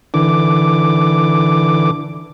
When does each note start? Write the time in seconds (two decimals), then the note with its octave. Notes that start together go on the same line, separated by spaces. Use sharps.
0.14 D3 E3 D6